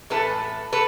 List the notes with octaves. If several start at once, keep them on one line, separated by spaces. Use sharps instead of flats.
A2 E3 A3 A4 B4
A4 B4